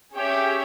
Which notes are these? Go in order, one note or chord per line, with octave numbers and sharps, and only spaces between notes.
C#4 G4 G#4 C#5 E5 G5